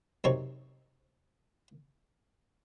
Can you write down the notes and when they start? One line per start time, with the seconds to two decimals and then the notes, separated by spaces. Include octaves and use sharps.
0.24 F#2 C3 C4 D#4 C#5